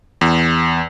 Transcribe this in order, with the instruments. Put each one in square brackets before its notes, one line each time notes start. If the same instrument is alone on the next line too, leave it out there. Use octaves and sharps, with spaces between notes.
[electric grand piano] E2